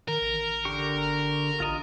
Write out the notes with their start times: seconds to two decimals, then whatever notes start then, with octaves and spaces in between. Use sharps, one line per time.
0.08 D#3 A#4
0.21 A1
0.65 D3 G4 C#6
0.94 G1
1.60 A1 F4 D#5